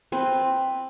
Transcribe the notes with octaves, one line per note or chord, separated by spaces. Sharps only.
C4 B4